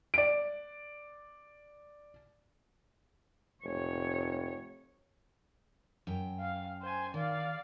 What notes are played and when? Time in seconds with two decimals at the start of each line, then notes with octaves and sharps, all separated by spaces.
0.14 D5 D7
3.64 F1 C#5
6.07 F#2 G5
6.40 F5
6.82 C5 G#5
7.14 D#3 D5 F5